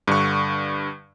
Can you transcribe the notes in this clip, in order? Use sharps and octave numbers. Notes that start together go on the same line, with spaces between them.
G2 D3 C#6